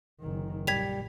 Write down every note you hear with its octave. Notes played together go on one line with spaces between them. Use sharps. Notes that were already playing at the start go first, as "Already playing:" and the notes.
F#1 D#3
A#1 G3 G#6 B6 F7